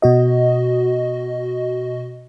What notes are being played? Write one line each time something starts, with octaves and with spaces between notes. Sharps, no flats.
B2 F#4 D#5